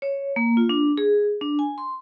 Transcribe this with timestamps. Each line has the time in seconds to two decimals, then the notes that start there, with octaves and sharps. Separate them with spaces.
0.02 C#5
0.36 A#3
0.57 F4
0.69 D4
0.98 G#4
1.41 D4
1.59 G#5
1.78 C6